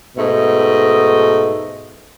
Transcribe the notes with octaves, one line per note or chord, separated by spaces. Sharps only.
G#2 B2 A3 D#5